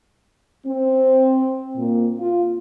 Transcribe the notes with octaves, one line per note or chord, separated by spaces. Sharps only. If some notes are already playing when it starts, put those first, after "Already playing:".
C4
A#2
F4